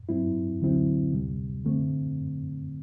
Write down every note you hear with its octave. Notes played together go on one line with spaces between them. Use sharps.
G2 F#3 C4 E4
D2 D3 F#3 C4 E4
D2 C3 G3
D3 A3 C4